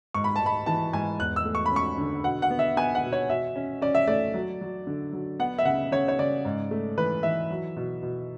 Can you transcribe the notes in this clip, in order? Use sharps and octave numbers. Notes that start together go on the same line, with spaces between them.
G#2 C#6
B5
G#2 A5
B5
E3 A5
G#2 G#5
E2 F#6
E6
A3
C#6
B5
C#4
C#6
D3
B2 F#5
F#5
B3
E5
B3 G#5
F#5
B2
C#5
B2 E5
C#4
C#4 D5
E5
A3 D5
F#3
F#3
D3
F#3
B3 F#5
E5
C#3 F#5
C#3 C#5
C#5
C#3 D5
G#2
A3
E3 B4
E3 E5
F#3
B2
B2